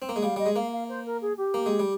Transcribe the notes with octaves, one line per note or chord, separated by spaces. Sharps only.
C4
A#3
G#3
G3 F5
G3 D#5
G#3
A#3 F5
F5
C5
A#4
G#4
G4
A#3
G#3
G3